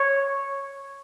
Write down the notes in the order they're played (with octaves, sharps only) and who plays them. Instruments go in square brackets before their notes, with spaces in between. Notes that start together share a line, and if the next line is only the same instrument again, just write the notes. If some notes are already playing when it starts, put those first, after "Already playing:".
Already playing: [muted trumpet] C#5